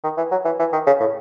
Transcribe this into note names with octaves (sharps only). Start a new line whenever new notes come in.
D#3
E3
F#3
E3
E3
D#3
C#3
A2